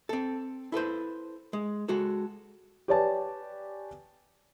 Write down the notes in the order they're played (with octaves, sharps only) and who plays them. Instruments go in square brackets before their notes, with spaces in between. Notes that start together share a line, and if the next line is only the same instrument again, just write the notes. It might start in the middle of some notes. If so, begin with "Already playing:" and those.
[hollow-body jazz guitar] C4 A4
E4 A4 B4 C5
G#3
G#3 F#4 A4
[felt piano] G4 B4 C#5 D5 G#5 A5